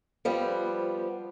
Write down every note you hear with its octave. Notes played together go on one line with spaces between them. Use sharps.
F3 G3 B3